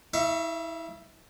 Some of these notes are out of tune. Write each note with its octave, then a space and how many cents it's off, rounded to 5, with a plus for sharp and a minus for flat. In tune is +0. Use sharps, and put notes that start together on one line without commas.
E4 -30 E5 +35 C#6 +0